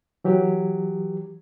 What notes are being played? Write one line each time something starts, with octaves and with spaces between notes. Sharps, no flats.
E3 F#3 G4